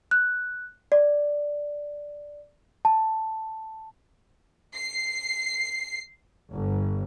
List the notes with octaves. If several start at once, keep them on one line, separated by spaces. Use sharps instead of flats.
F#6
D5
A5
C7
G1